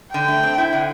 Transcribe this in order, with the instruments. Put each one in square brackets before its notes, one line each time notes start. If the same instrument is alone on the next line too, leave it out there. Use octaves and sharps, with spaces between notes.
[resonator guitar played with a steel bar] D3 [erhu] G5
[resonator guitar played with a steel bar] A3
C4
E4
D3